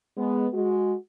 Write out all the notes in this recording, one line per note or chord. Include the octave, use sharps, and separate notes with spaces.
G#3 B3
G#3 F#4